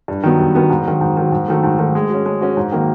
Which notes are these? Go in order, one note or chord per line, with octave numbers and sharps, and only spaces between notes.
G2
D#3 F#3 B3
G2
D#3 F#3 B3
G#2
D#3 F#3
G#2
D#3 F#3
G#2
D#3 F#3 A3
G#2
D#3 F#3 A3
G#3
C#4 F#4
G#3
C#4 F#4
G#2
D#3 F#3 A#3 D#4